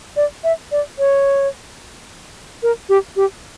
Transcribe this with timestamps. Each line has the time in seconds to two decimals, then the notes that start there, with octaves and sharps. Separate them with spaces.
0.17 D5
0.44 E5
0.72 D5
0.99 C#5
2.63 A#4
2.89 G4
3.16 G4